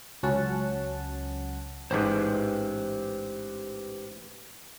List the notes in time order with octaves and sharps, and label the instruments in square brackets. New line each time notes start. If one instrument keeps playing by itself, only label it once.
[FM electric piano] C#2 F#3 C#4 F#5 A5
[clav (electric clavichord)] A1 G#2 [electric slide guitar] G4 B4 C5